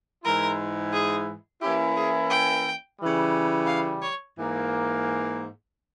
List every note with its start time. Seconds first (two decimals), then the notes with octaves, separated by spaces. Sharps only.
0.24 G#2 E3 G#3 E4 A#4
0.93 G#4
1.61 E3 A#3 C#4 E4 G4
1.97 G#4
2.30 G5
2.99 C#3 E3 G3
3.67 F5
4.02 C#5
4.36 G#2 E3 A#3